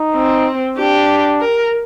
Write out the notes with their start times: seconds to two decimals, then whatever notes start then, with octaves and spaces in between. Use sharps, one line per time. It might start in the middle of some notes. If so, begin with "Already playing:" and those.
Already playing: D#4
0.15 C4
0.78 D4 G4
1.40 A#4